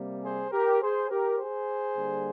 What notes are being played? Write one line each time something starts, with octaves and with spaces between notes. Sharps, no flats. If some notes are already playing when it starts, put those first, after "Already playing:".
Already playing: C3 G3 A#3
G#4 C5
G4 A#4
G#4 C5
G4 A#4
G#4 C5
D3 G3 A#3